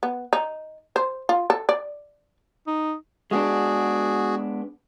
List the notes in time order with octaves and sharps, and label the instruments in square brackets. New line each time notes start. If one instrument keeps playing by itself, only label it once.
[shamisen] B3
D#4
C5
F4
A4
D5
[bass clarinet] D#4
[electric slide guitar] G#3 B3 D4 [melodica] F#4 G#4